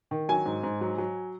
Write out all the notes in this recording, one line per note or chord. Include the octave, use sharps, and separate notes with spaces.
D#3
F#3 G#5
G#2
G#2
F#3
F#3